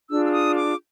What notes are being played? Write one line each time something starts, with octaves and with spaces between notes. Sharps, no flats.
D4 F4 G#4 E6
E6
D#6
D6